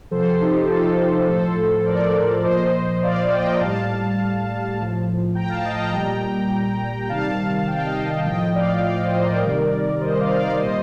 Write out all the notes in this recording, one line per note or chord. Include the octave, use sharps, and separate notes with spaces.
C3 F3 A4 C5
D#4 G4
F4 A4
A2 F3 A4 C5
A#4 D5
A#2 F3 C5 D#5
D5 F5
D#5 G5
A#5
A2 G3 F5 A5
A2 F3
G5 A#5
F5 A5
D#5 G5
G5 A#5
A#2 G3
G5
C3 D#3 G3 F5 A5
G5
F5
D#5 G5
A2 F3 D#5 G5
D5 F5
D5 F5
C5 D#5
A#4 D5
C3 D#3 G3
C5 D#5
D5 F5
D5 F5
A#2 G3 C5 D#5